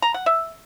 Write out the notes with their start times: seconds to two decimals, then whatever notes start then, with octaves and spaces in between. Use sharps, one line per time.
0.02 A#5
0.14 F#5
0.26 E5